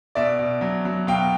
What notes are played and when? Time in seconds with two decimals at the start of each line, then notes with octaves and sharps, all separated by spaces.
0.15 B2 D5 E5
0.39 B2
0.61 F#3
0.85 F#3
1.07 B2 F5 G5